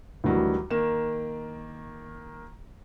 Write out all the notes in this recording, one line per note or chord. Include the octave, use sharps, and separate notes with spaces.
D2 D#3 E3 F#3 G3
D#3 A#3 E7